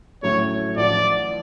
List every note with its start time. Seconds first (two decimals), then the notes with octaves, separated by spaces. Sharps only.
0.22 A2 F#3 A3 C#4 C#5
0.77 A1 A2 F3 D5